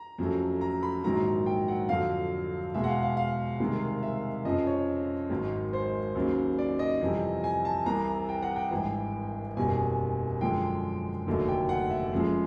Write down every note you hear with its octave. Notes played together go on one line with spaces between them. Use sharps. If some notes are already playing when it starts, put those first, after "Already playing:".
Already playing: A#5
F2 C#3 F#3 A3
A#5
B5
A#1 G#2 D#3 F#3 A#5
G5
F#5
F2 D3 F#3 F5
E2 B2 G#3 E5
F#5
F5
F5
F5
C2 C3 D#3 G#3
E5
F2 C#3 F3 D#5
C#5
G#1 G#2 D#3 F#3
C5
D#2 C#3 F#3
D5
D#5
F2 C3 E3 G3
G#5
A5
C2 C3 E3 A#5
G5
F#5
G5
G#1 G2 E3
F#1 E2 B2 G3 G#5
F#2 D3 F3 G#3 G5
F1 D#2 D3 F#3 A3
G5
F#5
E5
F2 C#3 F3 G#3